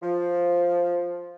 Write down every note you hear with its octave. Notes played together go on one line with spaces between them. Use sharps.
F3